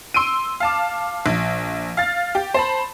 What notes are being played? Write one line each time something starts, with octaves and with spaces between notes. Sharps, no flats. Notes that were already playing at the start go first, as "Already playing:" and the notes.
C6 E6 D7 D#7
F5 A5 D6
A#1
F5 A6
G4
C5 A5 B5